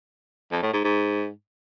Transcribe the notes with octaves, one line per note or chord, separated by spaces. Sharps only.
F2
A2
G#2
G#2